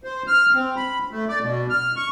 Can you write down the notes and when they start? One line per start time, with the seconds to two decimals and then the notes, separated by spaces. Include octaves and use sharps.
0.04 C5
0.27 F6
0.54 C4
0.76 B5
1.11 A3
1.29 D5
1.42 B2
1.70 F6
1.96 C#6